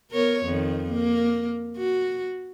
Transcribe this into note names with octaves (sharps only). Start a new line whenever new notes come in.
B3 A#4 C#5
F2 D#3
A#3
F#4